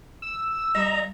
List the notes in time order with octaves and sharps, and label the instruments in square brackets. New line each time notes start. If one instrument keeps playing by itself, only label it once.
[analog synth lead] E6
[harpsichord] G2 [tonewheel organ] D#5 A#5